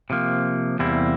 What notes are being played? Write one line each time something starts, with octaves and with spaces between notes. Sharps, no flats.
C3 F3 A#3
E2 C3 G3 A#3 E4